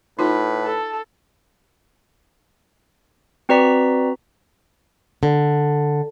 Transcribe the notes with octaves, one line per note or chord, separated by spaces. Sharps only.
A2 D#4 F4 B4
A4
C4 F#4 B4 D5 A#5 B6
D3